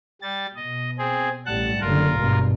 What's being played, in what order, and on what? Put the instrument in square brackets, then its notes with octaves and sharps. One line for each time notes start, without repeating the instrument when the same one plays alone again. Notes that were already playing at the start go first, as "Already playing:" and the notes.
[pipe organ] G3 A6
[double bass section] B2 [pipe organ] D#5
[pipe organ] C4 G#4
[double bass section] A1 A2 G3 [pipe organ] F#5 A5 F#6
[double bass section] F#1 D3 [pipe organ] F4 A#4
[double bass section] G#1 G2 B2